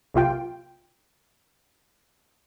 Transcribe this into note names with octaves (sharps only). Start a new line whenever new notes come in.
B1 C3 A#3 F4 G5